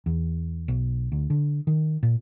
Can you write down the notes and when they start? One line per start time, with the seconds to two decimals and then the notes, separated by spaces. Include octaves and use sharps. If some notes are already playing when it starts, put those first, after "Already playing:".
0.06 E2
0.68 B1
1.12 D2
1.30 D3
1.67 D#3
2.03 A#2